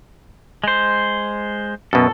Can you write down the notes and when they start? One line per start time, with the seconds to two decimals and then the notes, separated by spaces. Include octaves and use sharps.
0.64 G#3 C5
1.93 F#2 B2 A4